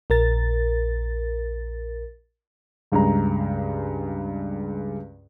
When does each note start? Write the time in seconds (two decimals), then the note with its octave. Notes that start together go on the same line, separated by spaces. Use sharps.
0.10 A#1 A#4 A6
2.92 C#2 G2 G#3 A#5